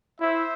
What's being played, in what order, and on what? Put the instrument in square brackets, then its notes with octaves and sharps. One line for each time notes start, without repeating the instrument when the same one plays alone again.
[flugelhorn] E4 [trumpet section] C5 E5